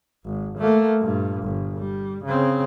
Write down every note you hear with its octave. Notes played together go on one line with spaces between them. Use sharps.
G#1
A3 A#3
G2 A#2
G1
G3
C#3 C4